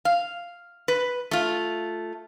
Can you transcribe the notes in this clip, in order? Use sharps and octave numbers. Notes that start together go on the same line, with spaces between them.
F5
B4
A3 F4